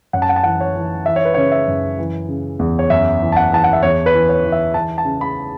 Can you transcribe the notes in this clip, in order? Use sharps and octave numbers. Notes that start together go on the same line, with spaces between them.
F#2 F#5
A5
F#5
A5
E3 F#5
C#5
E3
E3 E5
C#5
B4
C#3 C#5
E5
F#2
E3
C#3
E2
C#5
F#2 E5
E3
A5
F#5
E3 A5
F#5
E5
E2 C#5
B4
E3
C#5
E3
E5
E3 A5
A5
C#3
B5